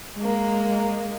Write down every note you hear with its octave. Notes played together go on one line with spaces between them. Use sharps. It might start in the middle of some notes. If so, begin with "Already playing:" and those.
G#3 A#3